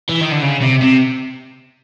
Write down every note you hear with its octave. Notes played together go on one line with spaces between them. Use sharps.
E3
D#3
D3
C#3
C3
C3